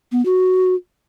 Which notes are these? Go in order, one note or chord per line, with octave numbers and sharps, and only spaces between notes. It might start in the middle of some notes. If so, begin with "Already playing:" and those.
B3
F#4